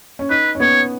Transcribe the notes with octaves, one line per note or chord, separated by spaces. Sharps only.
C#4
D#4 B4
C#4
B3 C#5